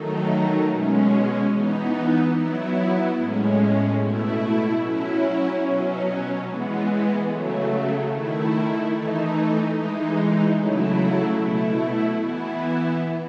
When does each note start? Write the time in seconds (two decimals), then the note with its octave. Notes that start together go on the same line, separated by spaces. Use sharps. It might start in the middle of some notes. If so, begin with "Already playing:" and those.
Already playing: D#3 F#3 A3 D#4
0.68 B2 G#3 C#4
1.50 E3 B3 D#4
2.33 F#3 B3 E4
3.15 A2 G#3 C#4
3.98 B2 A3 E4
4.80 F#3 C#4 E4
5.62 B2 F#3 C#4
6.45 E3 G#3 B3
7.28 C#3 F#3 A3
8.09 D#3 A3 E4
8.93 E3 A3 D#4
9.75 E3 G#3 D#4
10.57 C#3 F#3 A3 E4
11.39 B2 A3 E4
12.21 E3 B3 E4